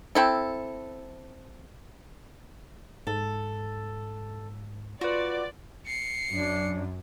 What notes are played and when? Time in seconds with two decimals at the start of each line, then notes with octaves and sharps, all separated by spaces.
0.15 C4 E4 A4
3.07 G#2 A4
5.01 F4 F#4 B4 D5
5.86 C7 C#7
6.32 F#2 D4